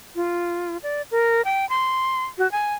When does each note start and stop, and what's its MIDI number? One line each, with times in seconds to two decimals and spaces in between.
0.15 0.77 65
0.83 1.02 74
1.11 1.42 70
1.45 1.68 79
1.69 2.25 84
2.38 2.50 66
2.52 2.74 80